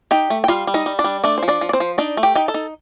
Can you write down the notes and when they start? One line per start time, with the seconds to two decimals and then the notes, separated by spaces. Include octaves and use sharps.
0.11 D#4 G4 G5
0.30 A3
0.44 G5
0.48 G3 F4 F5
0.67 G3
0.74 D#4 D#5
0.86 G3
0.99 D4 D5
1.04 G3
1.24 A3 D4 D5
1.38 F3 C5
1.48 D4 D5
1.61 F3
1.69 D5
1.73 C4 C5
1.80 F3
1.98 D4 D#4 D5
2.17 A3
2.23 G4 G5
2.35 D#4 G5
2.48 A4 A5
2.54 D#4